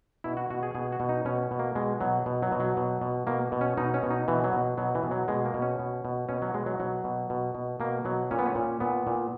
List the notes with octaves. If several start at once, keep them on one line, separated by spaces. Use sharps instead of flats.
B2 E4
F#4
B2 F#4
G#4
B2 G#4
F#4
B2
D#4
B2 C#4
B2
A#3
B2 G#3
B2 F#3
B2
F#3
B2
F#3
B2
B2
B2 A#3
B2
C#4
B2 D#4
C#4
B2
D#4
B2 E3
F#3
B2
B2 F#3
E3
B2
F#3
B2 G#3
A#3
B2
C#4
B2
B2
B2 C#4
F#3
B2 G#3
F#3
B2 F#3
B2
B2
B2
B2 A#3
B2 F#3
A#2 C#4
B3
C#4
A#2
A#2 B3
A#2